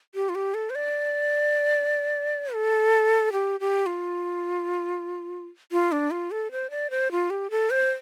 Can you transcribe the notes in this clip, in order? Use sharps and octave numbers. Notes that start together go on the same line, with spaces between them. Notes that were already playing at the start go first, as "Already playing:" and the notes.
G4
F4
G4
A4
C5
D5
A4
G4
G4
F4
F4
D4
F4
A4
C5
D5
C5
F4
G4
A4
C5